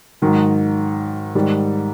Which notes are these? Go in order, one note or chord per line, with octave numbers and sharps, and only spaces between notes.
G#2 D#3 F#3
G#2 D#3 G3